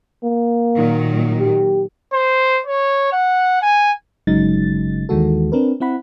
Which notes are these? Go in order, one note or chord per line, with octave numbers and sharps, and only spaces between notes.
A#3
A#2 D#3 F#3
G4
C5
C#5
F#5
G#5
G1 C#3 F#3 G#3 D#4 A6
D#2 D#3 E3 G#3 F#4 A4
C4 D4 A#4 B4
C4 E4 F#5 B5